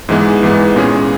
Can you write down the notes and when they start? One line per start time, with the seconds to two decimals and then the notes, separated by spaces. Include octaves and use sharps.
0.09 G#2 E3 G#3 B3
0.43 G#2 E3 G#3 B3
0.76 A#2 G#3 C#4 G#4